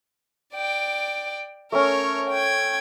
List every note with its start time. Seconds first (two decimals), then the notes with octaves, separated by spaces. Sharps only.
0.54 D5 G5
1.72 A3 C#4 A#4 C#5
2.30 G5 G#6